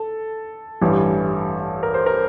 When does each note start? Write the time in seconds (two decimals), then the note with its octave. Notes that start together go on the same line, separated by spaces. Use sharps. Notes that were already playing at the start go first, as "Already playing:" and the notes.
Already playing: A4
0.81 A1 G2 E3 G3
1.83 A#4
1.94 C5
2.06 A#4